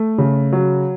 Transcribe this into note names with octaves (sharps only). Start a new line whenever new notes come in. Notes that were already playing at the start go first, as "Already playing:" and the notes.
Already playing: A3
C#3
F#3